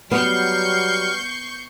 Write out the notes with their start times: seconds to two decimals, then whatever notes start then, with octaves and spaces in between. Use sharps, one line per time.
0.11 F#3 G3 B3 C#6 F6 G6 C7